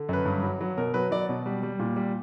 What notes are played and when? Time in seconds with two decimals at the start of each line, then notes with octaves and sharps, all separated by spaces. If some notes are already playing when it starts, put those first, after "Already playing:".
Already playing: D3
0.09 F#2 B4
0.25 G2
0.42 F#3
0.61 F#3
0.77 B2 A#4
0.94 F#3 B4
1.11 F#3 D5
1.29 B2
1.46 G3
1.63 G3
1.79 A#2
1.96 G3